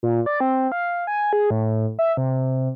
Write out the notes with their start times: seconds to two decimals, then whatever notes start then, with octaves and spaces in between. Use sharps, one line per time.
0.03 A#2
0.26 D5
0.40 C4
0.72 F5
1.07 G#5
1.33 G#4
1.50 A2
1.99 E5
2.17 C3